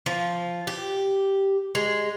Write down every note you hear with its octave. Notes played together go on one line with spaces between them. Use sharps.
F3
G4
G#3